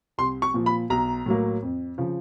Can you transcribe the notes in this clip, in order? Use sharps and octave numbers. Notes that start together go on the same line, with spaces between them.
C2 C6
C#6
A#2 F3
B5
B1 A#5
A2 F#3 A#3
F2
C#3 F3